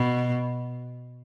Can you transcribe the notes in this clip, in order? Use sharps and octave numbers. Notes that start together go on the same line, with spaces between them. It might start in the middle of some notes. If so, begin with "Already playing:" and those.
Already playing: B2